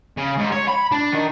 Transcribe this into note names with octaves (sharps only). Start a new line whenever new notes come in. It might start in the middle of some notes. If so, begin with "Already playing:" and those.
C#3
G#2
C#5
B5
D4
D#3